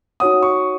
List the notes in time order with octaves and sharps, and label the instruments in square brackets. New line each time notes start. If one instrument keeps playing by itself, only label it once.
[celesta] D#4 F#4 C#5 F#5 [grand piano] D#6
[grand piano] C#6